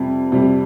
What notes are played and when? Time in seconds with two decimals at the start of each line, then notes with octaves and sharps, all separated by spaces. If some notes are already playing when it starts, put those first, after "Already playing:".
Already playing: F2 C3 G3
0.32 F2 C3 G3